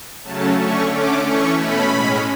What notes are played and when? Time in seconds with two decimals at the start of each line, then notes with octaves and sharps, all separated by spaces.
0.23 C#3 F#3 A3 C#4 A5
0.57 D3 A3 C#4 C#6
0.91 D3 A3 C#4 D6
1.24 E3 A3 C#4 C#6
1.58 B2 A3 C#4 B5
1.91 A2 G#3 C#4